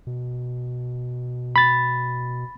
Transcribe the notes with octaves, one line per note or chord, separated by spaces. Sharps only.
B2
B5 A6